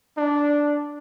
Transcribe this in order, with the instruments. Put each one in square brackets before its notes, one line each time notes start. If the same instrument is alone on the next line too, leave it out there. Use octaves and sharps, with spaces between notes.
[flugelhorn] D4